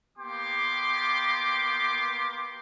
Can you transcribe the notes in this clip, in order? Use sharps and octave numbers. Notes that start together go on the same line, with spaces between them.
A#3 B3 G4 G5 C6 D6